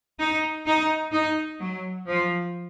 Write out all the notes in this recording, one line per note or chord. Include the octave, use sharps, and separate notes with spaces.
D#4
D#4
D#4
F#3
F3